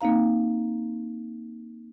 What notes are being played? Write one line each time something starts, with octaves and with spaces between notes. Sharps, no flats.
A#3 C4 D#4 F5 A#5